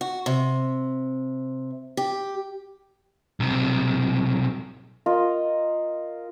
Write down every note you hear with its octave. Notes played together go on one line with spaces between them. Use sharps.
F#4
C3
G4
B1 C3
F4 A#4 D#5